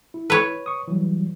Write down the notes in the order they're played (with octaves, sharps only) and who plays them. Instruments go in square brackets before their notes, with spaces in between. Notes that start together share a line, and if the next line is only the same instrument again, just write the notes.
[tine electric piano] E4
[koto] B4 C#5
[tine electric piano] C#6 D#6
E3 F#3 G3